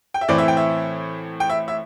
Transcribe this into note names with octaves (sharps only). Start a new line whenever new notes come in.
G5
E5
A2 E3 C4 D5
E5
G5
E5
G5
E5
E5